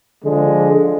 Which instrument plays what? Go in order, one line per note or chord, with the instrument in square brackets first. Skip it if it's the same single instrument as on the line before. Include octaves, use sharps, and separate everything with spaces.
[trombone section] D3 F3 G#3